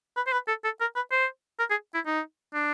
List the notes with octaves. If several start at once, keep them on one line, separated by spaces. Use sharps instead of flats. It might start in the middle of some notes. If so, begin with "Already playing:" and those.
B4
C5
B4
A4
A4
A#4
B4
C5
A#4
G#4
E4
D#4
D4